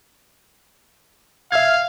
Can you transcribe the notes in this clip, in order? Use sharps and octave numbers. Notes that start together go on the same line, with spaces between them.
E5 F5 F6 G#6